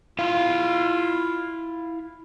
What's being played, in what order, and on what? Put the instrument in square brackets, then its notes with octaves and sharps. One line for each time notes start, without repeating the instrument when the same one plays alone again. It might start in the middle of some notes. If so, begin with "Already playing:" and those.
[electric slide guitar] E4 F5 [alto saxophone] F4